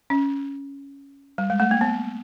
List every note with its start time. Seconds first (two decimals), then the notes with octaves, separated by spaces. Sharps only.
0.10 C#4
1.38 G3
1.50 G#3
1.60 A3
1.71 A#3
1.81 B3